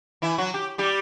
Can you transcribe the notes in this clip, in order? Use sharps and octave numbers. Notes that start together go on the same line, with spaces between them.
E3 E4
F#3 F#4
G4
G3 G4